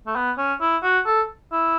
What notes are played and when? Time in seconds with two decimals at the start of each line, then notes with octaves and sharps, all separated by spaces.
0.07 A3
0.16 B3
0.38 C#4
0.61 E4
0.83 F#4
1.06 A4
1.52 E4